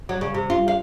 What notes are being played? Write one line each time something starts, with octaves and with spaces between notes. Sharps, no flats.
F#3
C#3
C3
F4
F5